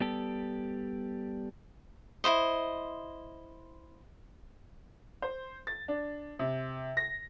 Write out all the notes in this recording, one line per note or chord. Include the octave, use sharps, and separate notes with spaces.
G3 B3 G4 A4
E4 F4 C5 D#5
C5
A6
D4
C3
A#6